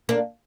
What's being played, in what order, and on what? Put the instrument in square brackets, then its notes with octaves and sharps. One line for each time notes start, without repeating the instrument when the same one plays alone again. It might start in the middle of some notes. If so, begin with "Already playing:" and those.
[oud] A#3 D4